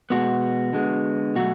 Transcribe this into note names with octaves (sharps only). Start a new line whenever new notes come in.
B2 G#3 B3 F#4
D3 G#3 B3
B2 F#3 A3 F#4